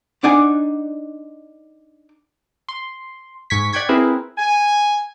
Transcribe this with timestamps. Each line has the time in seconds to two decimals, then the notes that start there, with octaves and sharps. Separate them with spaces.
0.23 D4 D#4 D5 F#5 G#5
2.69 C6
3.50 G#2 C#6 G#6 B6
3.73 D5 F#5 G5 C#6 G#6 B6
3.89 C4 E4 G#4 A#4 B4
4.38 G#5